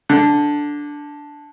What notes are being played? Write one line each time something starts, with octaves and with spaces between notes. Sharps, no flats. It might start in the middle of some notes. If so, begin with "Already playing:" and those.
D3